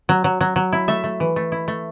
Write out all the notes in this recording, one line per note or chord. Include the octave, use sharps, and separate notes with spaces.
F#3
F#3
F#3
F#3
E4
A3 E5
A3
E3
A3
E4
A3